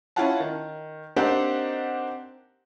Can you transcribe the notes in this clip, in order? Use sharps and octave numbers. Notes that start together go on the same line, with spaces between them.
C#4 E4 F4 F5 F#5 A5
D#3
A#3 C4 D4 D#4 G4 F#5